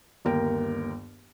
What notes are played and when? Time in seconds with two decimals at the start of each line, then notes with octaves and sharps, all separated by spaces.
0.25 G1 D#2 A#4 G5